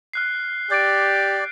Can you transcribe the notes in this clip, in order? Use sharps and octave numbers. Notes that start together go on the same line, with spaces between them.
F6 F#6 C7
G4 D5 G6 A6 D7